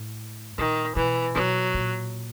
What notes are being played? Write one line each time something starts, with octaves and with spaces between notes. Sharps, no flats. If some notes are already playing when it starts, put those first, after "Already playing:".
Already playing: A2
A#2 D#3
B2 E3
B2 F#3
A#2